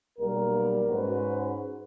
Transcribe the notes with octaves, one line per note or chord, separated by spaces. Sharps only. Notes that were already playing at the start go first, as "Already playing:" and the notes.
B1 G3 A#3 A#4
G#2 G#3 C#4 F#4 B4 C5